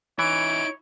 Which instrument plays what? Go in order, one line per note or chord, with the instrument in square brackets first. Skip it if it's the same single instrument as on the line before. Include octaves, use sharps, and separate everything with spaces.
[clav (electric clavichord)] E3 [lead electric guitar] D#4 E4 [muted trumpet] C#5 [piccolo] D7